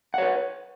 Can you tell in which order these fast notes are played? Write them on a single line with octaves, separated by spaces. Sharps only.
F#5 C#5 B4